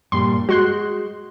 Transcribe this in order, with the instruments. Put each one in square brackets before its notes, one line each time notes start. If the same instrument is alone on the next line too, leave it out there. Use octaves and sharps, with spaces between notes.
[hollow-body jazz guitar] G2 A#2 G3 [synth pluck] C6
[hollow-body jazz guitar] G#3 [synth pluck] F#4 C6 F#6